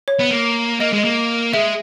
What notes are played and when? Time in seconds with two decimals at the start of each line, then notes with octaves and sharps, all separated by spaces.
0.08 C#5
0.19 B3
0.31 A#3
0.80 A#3 D#5
0.93 G#3
0.98 D#5
1.05 A#3
1.53 G#3 E5